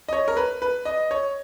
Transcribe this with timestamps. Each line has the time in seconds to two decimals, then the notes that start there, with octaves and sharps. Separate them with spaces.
0.09 D#5
0.13 C#5
0.28 A#4
0.37 B4
0.62 B4
0.85 D#5
1.11 C#5